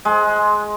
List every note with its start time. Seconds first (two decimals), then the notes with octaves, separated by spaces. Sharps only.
0.05 G#3